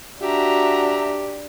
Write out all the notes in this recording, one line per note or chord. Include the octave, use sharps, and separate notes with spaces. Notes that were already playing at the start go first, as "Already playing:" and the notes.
D4 F#4 G4 E5 A#5